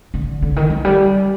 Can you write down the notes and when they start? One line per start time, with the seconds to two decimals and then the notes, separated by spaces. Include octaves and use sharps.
0.14 D3
0.42 D3
0.56 D#3
0.70 F3
0.85 G3